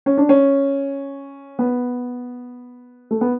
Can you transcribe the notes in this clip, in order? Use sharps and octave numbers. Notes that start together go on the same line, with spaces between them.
C#4
D4
C#4
B3
A3
B3